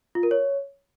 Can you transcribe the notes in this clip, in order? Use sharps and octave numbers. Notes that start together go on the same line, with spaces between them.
F4
A#4
C#5